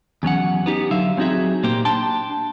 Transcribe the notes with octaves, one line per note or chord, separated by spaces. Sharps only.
E2 F#3 C#4 F#5
B3 D#4 G4
D3 F#3 E5 F5
F#3 C4 D#4 F#4 G#4 E5
A#2 A#3 G4 C5
D4 G5 A5 C6